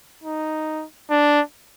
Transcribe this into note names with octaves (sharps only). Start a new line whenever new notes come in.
D#4
D4